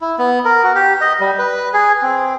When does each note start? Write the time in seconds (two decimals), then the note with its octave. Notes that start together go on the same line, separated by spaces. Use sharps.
0.01 E4
0.18 B3
0.45 A#4
0.64 F#4
0.75 G4
1.01 D#5
1.20 G3
1.38 B4
1.73 G#4
2.02 C4